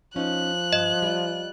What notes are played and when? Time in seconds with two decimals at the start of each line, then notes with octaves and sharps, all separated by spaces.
0.16 F3 C#4 D#4 F#6
0.73 G2 D#5
1.02 G3 F4